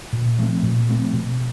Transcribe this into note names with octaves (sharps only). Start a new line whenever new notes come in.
A#2
F3 A3 C4
A#2
F3 A3 C4
B2